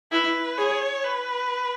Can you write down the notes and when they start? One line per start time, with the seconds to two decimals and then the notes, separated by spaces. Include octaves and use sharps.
0.12 E4 B4
0.58 G#4 C#5
1.04 B4